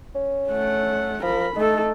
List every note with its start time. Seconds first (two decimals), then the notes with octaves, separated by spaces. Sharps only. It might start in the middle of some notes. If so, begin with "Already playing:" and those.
0.15 C#4
0.50 A3 F#5
1.23 F3 A#4 B5
1.56 A3 D#4 A4